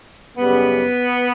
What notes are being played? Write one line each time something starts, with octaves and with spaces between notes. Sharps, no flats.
F#2 C#3 G3 B3